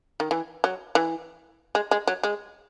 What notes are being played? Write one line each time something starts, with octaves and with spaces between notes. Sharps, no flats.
D#3
E3
F#3
E3
G#3
G#3
F#3
G#3